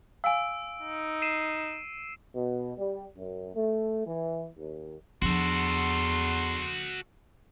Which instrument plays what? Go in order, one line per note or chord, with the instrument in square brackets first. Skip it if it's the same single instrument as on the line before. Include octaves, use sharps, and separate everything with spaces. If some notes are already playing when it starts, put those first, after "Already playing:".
[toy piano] F5 G#5 [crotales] E6 D7
[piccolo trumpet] D#4
[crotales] C7 D#7 E7
[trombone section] B2
G3
F#2
A3
E3
D#2
[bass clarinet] E2 [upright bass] F3 D4 [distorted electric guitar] F#4 A4 [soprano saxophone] C6